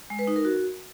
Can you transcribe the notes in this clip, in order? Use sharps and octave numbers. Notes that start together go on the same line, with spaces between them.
G#3
B4
D#4
A#4
F#4